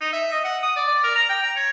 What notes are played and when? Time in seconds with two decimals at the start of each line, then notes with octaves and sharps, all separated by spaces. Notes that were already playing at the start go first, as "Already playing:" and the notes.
0.01 D#4
0.13 E5
0.32 D#5
0.44 F#5
0.62 D#6
0.76 D5
0.88 D5
1.03 A#4
1.15 A#5
1.29 G5
1.43 A#5
1.56 C#5